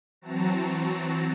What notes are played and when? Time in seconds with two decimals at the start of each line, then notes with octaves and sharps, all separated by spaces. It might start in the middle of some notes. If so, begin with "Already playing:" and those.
0.21 E3 F#3 C4 F#4 A5 A#5